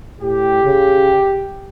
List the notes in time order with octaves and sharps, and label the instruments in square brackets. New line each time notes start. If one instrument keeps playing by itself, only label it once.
[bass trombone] A2 [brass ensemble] G4
[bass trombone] C#3